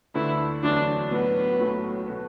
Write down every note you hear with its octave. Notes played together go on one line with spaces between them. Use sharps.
D2 D3 A3 D4 E4 B4
E2 D3 F#3 A3 D4 E4
B1 A2 F#3 B3
B1 A2 F#3 A3 F#4
B2 A3 F#4 B4